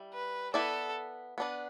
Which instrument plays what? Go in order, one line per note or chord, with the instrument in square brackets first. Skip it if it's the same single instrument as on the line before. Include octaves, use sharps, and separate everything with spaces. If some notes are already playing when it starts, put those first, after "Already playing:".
Already playing: [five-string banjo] G3 E4
[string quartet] B4
[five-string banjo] B3 E4 B4 D5 [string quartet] A4
[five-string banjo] B3 D4 B4